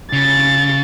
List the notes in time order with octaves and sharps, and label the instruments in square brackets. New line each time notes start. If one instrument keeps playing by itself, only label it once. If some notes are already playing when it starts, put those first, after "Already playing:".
[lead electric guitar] C#3 [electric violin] A6